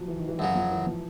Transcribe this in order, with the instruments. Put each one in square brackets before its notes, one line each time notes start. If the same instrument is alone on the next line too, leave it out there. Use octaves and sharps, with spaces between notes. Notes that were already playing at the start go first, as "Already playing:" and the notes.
Already playing: [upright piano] F3 F#3
E3
D#3
E3
[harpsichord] F#2 C#3 F#3 [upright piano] E3
[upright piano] F3
E3
F3